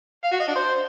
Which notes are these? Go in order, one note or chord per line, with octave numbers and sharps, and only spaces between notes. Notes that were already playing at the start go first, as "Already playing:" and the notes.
F5
F#4
D#5
D4
C5